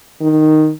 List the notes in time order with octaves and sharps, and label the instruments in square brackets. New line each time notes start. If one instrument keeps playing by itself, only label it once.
[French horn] D#3